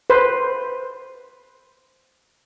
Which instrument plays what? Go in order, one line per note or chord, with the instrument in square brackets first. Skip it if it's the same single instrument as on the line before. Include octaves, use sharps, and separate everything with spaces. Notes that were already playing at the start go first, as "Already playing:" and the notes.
[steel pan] B4 C5